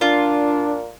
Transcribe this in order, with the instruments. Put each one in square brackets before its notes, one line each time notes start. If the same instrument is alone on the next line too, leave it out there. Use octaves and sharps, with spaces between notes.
[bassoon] A#2 [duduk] D4 [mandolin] F4